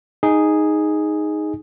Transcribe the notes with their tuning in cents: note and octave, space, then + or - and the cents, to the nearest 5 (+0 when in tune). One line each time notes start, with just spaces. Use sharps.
D#4 +0 G#4 +0